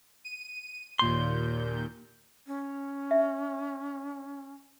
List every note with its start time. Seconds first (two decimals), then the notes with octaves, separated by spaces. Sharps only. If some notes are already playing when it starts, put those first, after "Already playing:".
0.25 D#7
0.99 D#2 A#2 C6 G6
2.47 C#4
3.11 E5